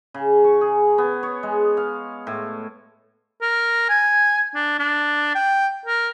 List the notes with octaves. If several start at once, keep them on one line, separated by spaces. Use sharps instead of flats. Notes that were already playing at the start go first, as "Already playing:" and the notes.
C#3
C#6
G#4
B3
C#5
G#3
F5
A2
A#4
G#5
D4
D4
G5
A#4